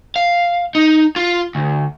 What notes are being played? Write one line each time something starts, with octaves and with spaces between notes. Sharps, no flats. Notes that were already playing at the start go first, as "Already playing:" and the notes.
F5
D#4
F4
D2